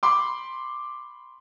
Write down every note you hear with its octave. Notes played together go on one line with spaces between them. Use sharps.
B5 C6 D6